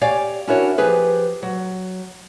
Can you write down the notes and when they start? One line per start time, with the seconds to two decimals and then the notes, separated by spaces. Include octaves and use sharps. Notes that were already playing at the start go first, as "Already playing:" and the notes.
0.01 G4 C#5 D5 F5 G#5
0.47 C#4 D4 E4 F#4 A#4 C#5
0.78 F3 G4 G#4 B4
1.42 F#3